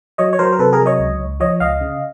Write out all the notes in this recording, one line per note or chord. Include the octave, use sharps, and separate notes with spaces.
F#3 C#5 D#5
C#5
F#3 A#4 C5
A#4
C3 A4 B4
G#4 A#4
F#3
C#5 D#5
C#2
C#2
F3 C#5 D#5
C#2 D#5 F5
C#3